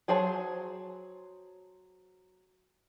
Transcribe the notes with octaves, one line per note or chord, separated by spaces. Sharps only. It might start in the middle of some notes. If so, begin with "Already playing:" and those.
F#3 G#4 C5 C#5 A5